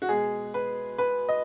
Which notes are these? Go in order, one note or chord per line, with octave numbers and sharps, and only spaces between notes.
F#4
B2 G#3 G#4
B4
B4
D#5